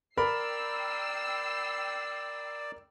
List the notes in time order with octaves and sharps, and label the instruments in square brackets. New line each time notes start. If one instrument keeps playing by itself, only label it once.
[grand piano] A#4 B5 [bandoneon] D5 [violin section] G5 E6 C7